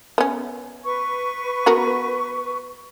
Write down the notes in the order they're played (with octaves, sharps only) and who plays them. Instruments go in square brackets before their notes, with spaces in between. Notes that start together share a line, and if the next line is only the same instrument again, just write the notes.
[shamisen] B3 C#4
[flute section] B4 C#6
[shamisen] B3 F#4 A#4